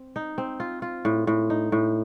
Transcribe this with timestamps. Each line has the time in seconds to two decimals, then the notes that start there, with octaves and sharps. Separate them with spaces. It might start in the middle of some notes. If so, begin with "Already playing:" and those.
Already playing: C4
0.16 D#4
0.38 C4
0.60 F4
0.82 F4
1.05 A2
1.27 A2
1.50 D#4
1.72 A2